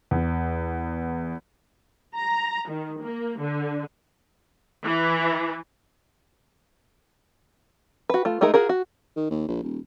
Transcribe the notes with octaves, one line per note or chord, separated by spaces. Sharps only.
E2
A#5
D#3
A#3
D3
E3
F#4 B4
A3 F4
G#3 A3 D#4 G#4 A#4
F4 F#4 G#4 A#4
F#4
D#3
D#2
A#1
D#1